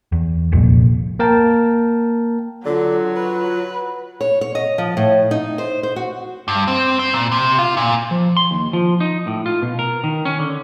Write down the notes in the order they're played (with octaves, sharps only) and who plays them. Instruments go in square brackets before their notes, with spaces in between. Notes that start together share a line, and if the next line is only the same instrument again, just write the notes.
[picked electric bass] E2
D#1 C2 F2 A#2
[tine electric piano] A#3 A#4 G5 A5
[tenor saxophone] D3 [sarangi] F#3 [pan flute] F4
[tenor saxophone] B4
[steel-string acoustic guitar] C#5
C#5
D#5
F3
A2
D#4
C5
C5
F#4
[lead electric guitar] G2
C4
C4
A#2
C3
F4
A#2
[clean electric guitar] F3
C6
D#2
F3
D#4
A2
F4
B2
A#4
D#3
C#4
D3